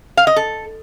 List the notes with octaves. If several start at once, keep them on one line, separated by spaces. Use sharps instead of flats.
F5
D#5
A4